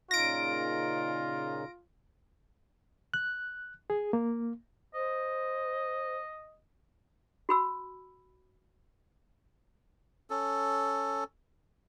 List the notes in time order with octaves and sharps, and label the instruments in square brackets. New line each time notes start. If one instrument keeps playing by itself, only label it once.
[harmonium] A#2 C#3 D#4 [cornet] F4 [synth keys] A#6 D7
[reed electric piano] F#6
G#4
A#3
[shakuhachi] C5 [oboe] D#5
[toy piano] F#4 B5 E6
[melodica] C#4 A4